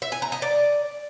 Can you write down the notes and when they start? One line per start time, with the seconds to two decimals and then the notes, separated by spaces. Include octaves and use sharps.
0.02 E5
0.12 G#5
0.22 A#5
0.32 D#5
0.42 D5